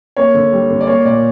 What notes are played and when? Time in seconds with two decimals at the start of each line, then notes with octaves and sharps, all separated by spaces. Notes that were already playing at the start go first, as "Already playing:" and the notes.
0.17 A#3 C#5
0.34 D3
0.52 G3
0.70 D3
0.81 D5
0.87 A#3 C#5
1.05 A#2 D5